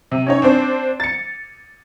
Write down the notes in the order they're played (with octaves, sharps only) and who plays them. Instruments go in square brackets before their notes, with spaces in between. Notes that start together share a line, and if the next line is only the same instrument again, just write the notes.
[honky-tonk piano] C3
C#4 D#4 C#5
C4 D4 C5
A6 C#7